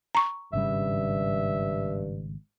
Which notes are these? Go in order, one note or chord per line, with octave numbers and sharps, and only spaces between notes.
A#5 C#6
G#1 G2 C#3 G3 E5